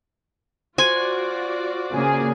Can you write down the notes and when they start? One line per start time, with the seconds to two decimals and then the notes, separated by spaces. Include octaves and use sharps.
0.78 F4 F#4 C5 D5 G#5 C6
1.93 C#3 A#3 G#4